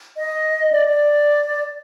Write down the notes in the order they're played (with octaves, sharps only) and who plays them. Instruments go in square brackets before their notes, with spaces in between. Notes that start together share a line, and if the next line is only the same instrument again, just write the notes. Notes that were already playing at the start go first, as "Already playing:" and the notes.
[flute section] D#5
D5
D5